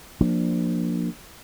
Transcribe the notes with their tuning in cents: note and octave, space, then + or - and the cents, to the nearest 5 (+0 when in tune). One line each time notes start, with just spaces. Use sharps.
F3 +10 A#3 +0 D4 +10